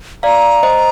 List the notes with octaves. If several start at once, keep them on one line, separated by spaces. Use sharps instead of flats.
D5 F5 A#5
C5 D#5